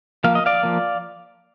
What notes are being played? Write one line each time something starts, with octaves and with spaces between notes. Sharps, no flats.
F3 A#3 F5
D#5
D5 F5
F3 A#3